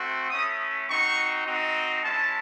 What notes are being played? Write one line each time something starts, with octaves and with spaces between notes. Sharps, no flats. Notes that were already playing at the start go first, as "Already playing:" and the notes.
Already playing: A3 C4 F#4
A3 C#4 E4 D#6
C4 D#4 F#4 C#6
C4 D#4 F#4
G#3 C#4 E4 A5